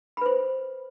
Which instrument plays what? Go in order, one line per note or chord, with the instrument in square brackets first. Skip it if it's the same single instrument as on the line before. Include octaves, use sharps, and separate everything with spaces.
[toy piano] B5
B4
C5